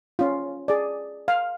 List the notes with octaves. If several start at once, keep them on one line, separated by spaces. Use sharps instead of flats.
C#4 F4
G#4 D5
F5